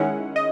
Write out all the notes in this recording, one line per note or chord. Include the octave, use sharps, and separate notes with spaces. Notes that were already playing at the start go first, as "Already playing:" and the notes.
Already playing: D#3 G#3 C#4 E4 F#5
D#5